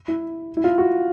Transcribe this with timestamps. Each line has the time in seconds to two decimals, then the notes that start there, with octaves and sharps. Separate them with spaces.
0.08 E4
0.57 E4
0.64 F4
0.78 F#4